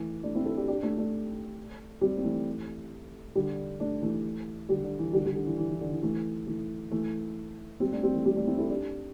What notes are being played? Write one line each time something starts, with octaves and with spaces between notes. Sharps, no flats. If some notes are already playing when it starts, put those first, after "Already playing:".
Already playing: E3 A3
A3 D4
C4 E4
E4 A4
D4 G4
D4 G4
A3 D4
A3 D4
G3 C4
C4
E3 A3
D3 G3
A3 D4
E3 A3
D3 G3
D3
E3
D3 G3
D3 G3
D3
E3
E3
E3
D3
E3
E3 A3
E3 A3
E3 A3
G3 C4
A3 D4
G3 C4
E3 A3
G3 C4
A3 D4
C4 E4
E4 A4
D4 G4